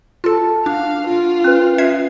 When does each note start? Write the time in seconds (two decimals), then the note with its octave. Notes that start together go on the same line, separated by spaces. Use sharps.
0.24 F4 A4 A5
0.66 D4 F#4 F5
1.07 A#3 F4 F#4
1.44 C#4 B4
1.78 B3 D#4 A#4 E5 G#6 C7